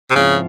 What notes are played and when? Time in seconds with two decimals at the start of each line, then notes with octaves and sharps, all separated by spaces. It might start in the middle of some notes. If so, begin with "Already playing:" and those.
0.10 C3
0.15 G#2 C#3 F3 C4 E4